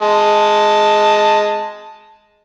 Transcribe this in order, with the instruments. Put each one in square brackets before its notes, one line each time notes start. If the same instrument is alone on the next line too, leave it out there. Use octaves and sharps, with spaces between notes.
[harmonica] G#3 A5